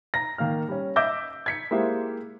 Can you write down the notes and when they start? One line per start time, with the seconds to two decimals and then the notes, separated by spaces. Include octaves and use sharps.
0.14 A#5 A#6
0.38 D#3 A#3 F5 F6
0.69 G3 C#4
0.96 D#5 E5 D6 E6 G6 A#6
1.46 G#6 B6 C#7
1.71 G#3 A#3 E4 G4 C5